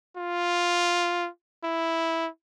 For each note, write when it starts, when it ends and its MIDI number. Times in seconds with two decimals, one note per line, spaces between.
0.17 1.29 65
1.64 2.28 64